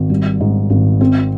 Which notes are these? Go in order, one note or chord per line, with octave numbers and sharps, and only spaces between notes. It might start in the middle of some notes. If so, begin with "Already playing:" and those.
Already playing: G#1
G3
G#2
G#1
C4